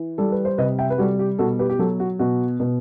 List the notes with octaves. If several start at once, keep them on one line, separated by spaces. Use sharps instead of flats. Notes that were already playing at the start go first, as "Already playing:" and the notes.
Already playing: E3
G3 A4
B4
C5
C3 B4 D#5
E5 G5
B4
G3 F#4 A4
G4
B2 F#4 A4
G4 B4
G4
F#3 F#4 A4
F#4
B2 F#4
B2